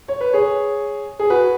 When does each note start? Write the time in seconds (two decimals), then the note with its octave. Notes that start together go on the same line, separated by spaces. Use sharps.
0.08 C#5
0.21 B4
0.33 G#4 C#5
1.19 G#4
1.30 F#4 B4